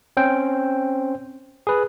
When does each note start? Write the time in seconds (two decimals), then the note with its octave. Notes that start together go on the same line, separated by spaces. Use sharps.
0.17 C4 C#4 C5 G5
1.67 G#4 B4